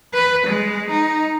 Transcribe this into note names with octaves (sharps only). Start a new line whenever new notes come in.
B4
G#3
D#4